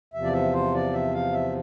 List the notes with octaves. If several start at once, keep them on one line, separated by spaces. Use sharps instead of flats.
E2 C3 F3 E5
D5
E5
C5
D5
E5
F5
E5